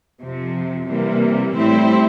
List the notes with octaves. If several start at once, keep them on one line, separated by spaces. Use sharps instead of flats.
F2 C3 F3
C3 E3 G3 A#3
A2 G3 C4 E4